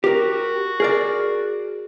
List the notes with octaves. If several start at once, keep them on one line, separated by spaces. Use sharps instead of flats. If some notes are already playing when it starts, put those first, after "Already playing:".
F#4 G4 A#4
G#4 A#4 D5